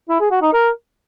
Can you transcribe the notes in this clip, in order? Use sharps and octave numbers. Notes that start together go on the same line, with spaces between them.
E4
G#4
F#4
D#4
A#4